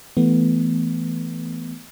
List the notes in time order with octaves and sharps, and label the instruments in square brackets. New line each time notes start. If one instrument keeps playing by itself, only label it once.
[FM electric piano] E3 A3 B3